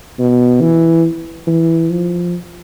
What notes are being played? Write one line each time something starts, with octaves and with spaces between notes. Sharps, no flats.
B2
E3
E3
F3